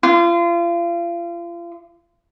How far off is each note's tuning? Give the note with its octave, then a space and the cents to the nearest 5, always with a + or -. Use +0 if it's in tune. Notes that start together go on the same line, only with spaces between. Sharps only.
F4 -35